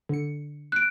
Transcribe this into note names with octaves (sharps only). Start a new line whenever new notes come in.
D3 C#7
F#6 D7